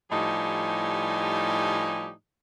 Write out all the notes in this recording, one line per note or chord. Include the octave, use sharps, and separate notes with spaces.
A2 F3 G3 D#4 G4 G#5